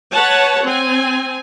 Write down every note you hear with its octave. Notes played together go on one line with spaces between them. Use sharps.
B4 C#5 F#5 A5
C4 G#5